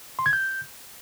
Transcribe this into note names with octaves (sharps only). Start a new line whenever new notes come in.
C6
G#6
G6